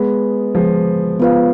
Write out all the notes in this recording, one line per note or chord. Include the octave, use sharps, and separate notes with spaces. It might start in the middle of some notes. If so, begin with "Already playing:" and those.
Already playing: G#3 B3
F3 G#3
B3 F4 B4 F5